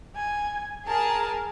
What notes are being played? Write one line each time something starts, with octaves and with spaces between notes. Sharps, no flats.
G#5
G#4 A#4 A5